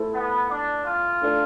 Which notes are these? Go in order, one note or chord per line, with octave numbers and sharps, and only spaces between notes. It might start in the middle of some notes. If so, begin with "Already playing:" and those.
Already playing: A3 E4 A4 C5
B3
D4
F4
A3 D4 A4